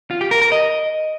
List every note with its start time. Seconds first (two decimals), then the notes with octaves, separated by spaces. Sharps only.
0.11 F4
0.21 G4
0.31 A#4
0.42 A#4
0.52 D#5